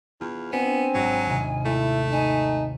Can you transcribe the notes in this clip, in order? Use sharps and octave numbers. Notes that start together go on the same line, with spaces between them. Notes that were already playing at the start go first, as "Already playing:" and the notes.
E2 F4
B3 C4 D4 G#5
G#1 F#3 A#5
D#2 C3
A3 E4
D#4 G#5